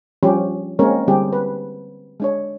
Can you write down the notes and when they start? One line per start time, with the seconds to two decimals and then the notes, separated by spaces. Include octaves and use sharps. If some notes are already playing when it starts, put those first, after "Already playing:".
0.23 F3 G3 C#4 D4 G4
0.79 G#3 A#3 C4 C#4 A#4 C#5
1.08 D3 G3 C4 G4 G#4
1.33 B4
2.20 G#3 D4 C#5